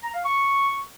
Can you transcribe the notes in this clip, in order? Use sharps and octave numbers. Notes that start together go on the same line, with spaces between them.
A#5
F5
C#6